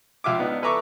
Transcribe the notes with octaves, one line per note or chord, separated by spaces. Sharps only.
C#2 F4 E5 D6
B3 D4 D#4
A4 B4 E5 A#5 C#6 D6